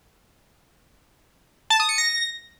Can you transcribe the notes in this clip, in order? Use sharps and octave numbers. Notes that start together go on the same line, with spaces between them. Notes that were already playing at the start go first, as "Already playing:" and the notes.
A5
D#6
C#7
A#6